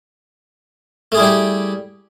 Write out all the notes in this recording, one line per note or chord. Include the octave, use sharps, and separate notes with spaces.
G3 A3 E4 G4 G#4